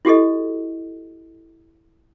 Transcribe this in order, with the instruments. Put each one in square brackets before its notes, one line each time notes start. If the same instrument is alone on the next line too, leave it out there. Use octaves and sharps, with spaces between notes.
[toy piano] E4 F#4 G4 A4 D#5